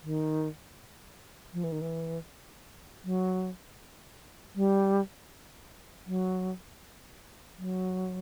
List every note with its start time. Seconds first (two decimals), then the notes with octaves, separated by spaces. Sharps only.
0.03 D#3
1.53 F3
1.64 E3
1.72 D#3
1.81 E3
3.04 F#3
4.55 G3
6.07 F#3
7.58 F#3